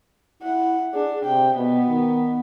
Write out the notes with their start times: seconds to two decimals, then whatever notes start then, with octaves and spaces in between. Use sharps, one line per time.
0.43 E4 F#5
0.94 D4 G#4
1.25 C3 G5
1.56 B2 B3
1.89 D#3